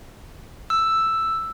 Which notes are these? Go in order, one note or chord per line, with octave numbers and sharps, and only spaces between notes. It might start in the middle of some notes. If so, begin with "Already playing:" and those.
E6